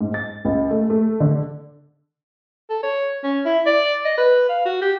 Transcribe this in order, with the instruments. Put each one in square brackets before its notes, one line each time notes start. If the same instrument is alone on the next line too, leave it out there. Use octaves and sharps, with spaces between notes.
[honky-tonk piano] G#2
A6
C#2
A3
A3
D3
[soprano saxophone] A4
C#5
C#4
E4
D5
D#5
B4
F5
F#4
G4